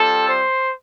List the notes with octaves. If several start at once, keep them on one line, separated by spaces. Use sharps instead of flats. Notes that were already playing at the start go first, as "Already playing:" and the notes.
Already playing: G3 C4 F4 A4
C5